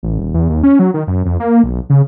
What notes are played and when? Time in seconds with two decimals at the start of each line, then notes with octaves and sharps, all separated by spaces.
0.03 A1
0.18 D#1
0.34 E2
0.49 D#2
0.63 C#4
0.79 F#3
0.94 D#3
1.07 F#2
1.25 F2
1.40 A#3
1.64 B1
1.90 C#3